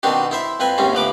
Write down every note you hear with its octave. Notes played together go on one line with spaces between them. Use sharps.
B2 D#3 C4 D4 F#4
E4 C5 E5
F2 C4 B4 G#5
D#2 G#2 C3 C4 C#4
D2 F3 B4 D6